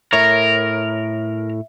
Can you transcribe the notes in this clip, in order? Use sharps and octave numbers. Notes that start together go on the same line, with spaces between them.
A2 A#4 C#5 E5